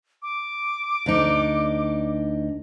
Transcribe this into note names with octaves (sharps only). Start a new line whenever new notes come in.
D6
D2 D4 D#4